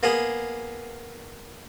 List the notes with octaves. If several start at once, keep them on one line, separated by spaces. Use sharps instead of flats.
A#3 B3 G#4